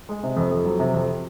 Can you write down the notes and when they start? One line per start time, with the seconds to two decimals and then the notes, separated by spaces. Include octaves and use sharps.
0.09 G#3
0.23 C3
0.36 F2
0.51 F2
0.65 F#3
0.79 C3
0.94 F2